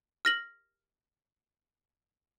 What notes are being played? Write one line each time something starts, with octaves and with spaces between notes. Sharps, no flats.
F6 A#6 F#7